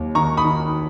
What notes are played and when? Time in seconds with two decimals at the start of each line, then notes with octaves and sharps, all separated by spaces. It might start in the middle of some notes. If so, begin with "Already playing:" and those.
Already playing: D#2 F#3
0.15 D#3 A#5 C#6
0.37 B5 D#6
0.45 D#3